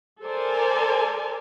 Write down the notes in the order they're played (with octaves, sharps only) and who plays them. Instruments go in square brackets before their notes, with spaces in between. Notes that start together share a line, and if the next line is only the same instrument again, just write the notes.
[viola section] A4 A#4 C5 D5 G#5 A5